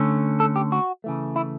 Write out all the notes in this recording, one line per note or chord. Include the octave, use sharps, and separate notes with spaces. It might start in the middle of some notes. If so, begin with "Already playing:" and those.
Already playing: D3 A3 C#4
A4
G4
F#4
C#3 E3 A3
E4